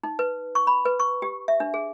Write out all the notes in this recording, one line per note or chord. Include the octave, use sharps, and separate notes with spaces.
D#4
B4
C#6
B5
B4
C#6
G4
E5
D4
G#4